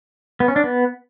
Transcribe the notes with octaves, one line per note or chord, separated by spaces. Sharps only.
B3
C#4
D4
B3